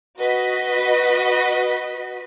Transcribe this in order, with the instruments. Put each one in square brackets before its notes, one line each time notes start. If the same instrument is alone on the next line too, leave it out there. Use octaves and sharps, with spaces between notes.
[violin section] F#4 B4 D#5 B6